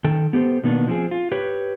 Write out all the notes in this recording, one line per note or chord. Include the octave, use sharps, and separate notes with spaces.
D#3 A4 G5
B3 G4 A4 C5
B2 D#3 A#3 B3 D4
F3 C4 G#4
F4
G4 B4 C#5